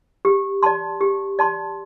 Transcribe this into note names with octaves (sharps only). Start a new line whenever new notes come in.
G4
D5 A5 C6
G4
D5 A5 C6